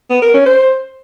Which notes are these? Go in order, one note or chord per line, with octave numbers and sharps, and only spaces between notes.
B3
A#4
C#4
C5